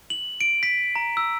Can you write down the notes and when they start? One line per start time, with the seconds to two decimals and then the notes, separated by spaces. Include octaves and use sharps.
0.10 F#7
0.41 D7
0.63 B6
0.96 A#5
1.17 E6